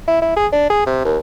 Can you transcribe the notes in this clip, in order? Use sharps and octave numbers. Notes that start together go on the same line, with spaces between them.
E4
E4
G#4
D4
G#4
C3
D#2